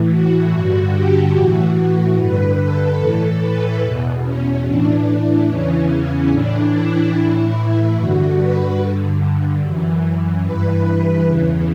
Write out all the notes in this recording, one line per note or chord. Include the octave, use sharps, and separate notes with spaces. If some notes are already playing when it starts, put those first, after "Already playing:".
Already playing: A2 E3
F#4
G2 D3 F#4
G4
A2 E3 F#4
F#4
G2 D3 B4
A4
A2 E3 A4
B4
E2 B2
C#4
A2 E3 D4
E2 C#3 E3 C#4
A2 E3 D4
E4
A2 E3
G2 D3 F#4
B4
G2 D3
F#2 E3
G2 E3 B4
B4
E2 C#3 E3